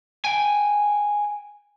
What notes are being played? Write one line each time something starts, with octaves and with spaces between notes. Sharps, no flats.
G5 G#5